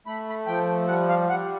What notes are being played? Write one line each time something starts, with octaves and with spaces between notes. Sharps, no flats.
A3 B5
B5
F3 G5
G3 F#5
F5
G3 F#5